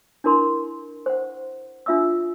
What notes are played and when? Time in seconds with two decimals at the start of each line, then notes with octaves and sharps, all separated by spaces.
0.24 D4 E4 A#4 C6
1.06 C5 F#5
1.86 D4 F4 E5 D#6 E6